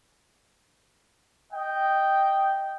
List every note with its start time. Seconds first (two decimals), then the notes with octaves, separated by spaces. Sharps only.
1.52 D#5 G5